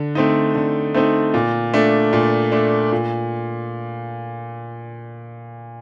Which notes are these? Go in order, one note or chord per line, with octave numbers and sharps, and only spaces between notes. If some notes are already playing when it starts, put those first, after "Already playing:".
Already playing: D3
A3 C4 D#4
D3
A3 C4 D#4
A#2
A3 D4
A#2
A3 D4
A#2